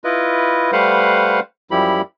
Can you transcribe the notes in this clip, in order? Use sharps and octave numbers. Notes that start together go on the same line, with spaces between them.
E4 F4 B4 D#5
G3 A3 B4 C5 F5 F#5
F#2 F3 G3 E4 G4 B5